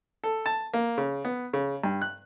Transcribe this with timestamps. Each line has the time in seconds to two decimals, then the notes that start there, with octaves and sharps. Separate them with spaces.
0.24 A4
0.46 A5
0.74 A#3
0.98 C#3
1.25 B3
1.53 C#3
1.84 G2
2.02 F#6